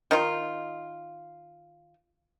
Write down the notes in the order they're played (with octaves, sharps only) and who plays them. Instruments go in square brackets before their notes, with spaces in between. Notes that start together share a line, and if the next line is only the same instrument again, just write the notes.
[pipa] D#3 D#4 F4